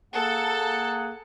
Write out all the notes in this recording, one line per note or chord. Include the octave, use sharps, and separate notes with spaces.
A#3 G#4 A4 F#5